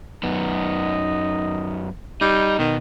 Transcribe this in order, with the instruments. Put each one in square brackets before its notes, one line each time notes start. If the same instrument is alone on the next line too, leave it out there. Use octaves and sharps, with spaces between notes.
[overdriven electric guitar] F#2 B3 [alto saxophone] D#4
[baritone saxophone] G3 [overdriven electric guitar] D#4
[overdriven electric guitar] B2 [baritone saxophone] D#3